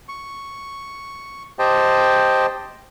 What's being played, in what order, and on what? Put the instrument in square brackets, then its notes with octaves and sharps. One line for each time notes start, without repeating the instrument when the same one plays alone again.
[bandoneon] C#6
G4 C5 D#5 G5 A5